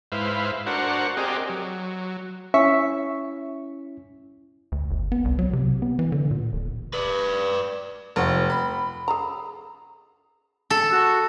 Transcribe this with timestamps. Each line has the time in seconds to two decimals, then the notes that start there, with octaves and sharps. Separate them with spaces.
0.12 G#2 E4 B4 C5 F5
0.67 D4 F#4 A#4 C5 F#5 C#6
1.17 C4 G4 G#4 A#4 D5 D#5
1.49 F#3
2.54 C#4 E4 E5 C#6 B6
4.72 D2
4.91 G1
5.12 B3
5.25 C2
5.39 F#3
5.53 C3
5.82 B3
5.99 E3
6.12 D3
6.31 A#2
6.53 D1
6.94 B4 D5
8.16 F1 B3 F4 F#4
8.50 B5
9.08 G#4 A4 A#5
10.70 A4
10.92 F#4